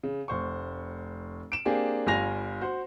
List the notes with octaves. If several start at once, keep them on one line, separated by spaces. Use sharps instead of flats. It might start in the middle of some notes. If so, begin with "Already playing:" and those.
C#3
F1 C5 C#6
D7 E7
A#3 C4 D4 G4 G#4
G1 G3 F4 G#5 A#6 F7
F#4 C5